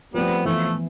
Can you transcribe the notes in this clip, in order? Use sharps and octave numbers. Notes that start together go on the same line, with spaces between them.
F3 G3 A3 B3 C4
E3 F3 A3 B3 E4